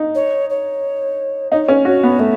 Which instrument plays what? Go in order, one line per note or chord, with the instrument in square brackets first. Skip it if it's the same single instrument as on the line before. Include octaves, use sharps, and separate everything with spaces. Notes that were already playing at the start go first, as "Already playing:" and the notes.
Already playing: [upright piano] D#4
[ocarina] C#5
C#5
[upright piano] D#4 [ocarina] C#5
[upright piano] C#4
[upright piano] F#4 [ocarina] C#5
[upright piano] B3
[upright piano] A3 [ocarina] E5